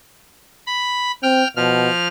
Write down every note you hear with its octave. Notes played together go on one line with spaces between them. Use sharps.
B5
C4 G5 F6
B2 F3 F6